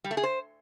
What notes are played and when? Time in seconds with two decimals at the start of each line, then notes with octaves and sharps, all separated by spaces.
0.04 G3
0.11 A3
0.17 G#4
0.23 C5